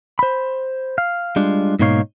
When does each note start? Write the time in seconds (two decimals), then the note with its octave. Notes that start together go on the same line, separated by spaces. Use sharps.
0.19 C5 B5
0.98 F5
1.36 G3 G#3 D4 F4
1.79 G#2 B2 A#3 D#4 C#5 F5